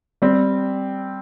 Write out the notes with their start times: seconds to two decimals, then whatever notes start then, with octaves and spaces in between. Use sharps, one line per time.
0.22 G3 C4